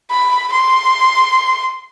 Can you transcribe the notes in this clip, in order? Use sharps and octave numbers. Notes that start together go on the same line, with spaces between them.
B5
C6